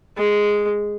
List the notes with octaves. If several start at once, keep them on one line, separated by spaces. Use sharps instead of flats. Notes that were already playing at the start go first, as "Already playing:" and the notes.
G#3